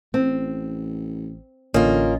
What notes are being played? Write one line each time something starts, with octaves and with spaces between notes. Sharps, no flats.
A1 C4
A1 D3 A#3 C#4 F4 D#5